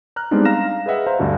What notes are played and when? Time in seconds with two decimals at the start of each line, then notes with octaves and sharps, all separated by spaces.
0.16 A#5 F6 F#6
0.31 G3 G#3 B3 C4 D4 D#4
0.45 F5 A#5 F6 A#6 E7
0.86 G#4 B4 D#5 E5 F#5
1.07 C5 F5 A#5
1.19 D2 G2 D3 F#4 A5